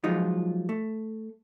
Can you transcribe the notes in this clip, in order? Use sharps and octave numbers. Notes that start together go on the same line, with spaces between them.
F3 F#3 G#3 D#4 F4
A3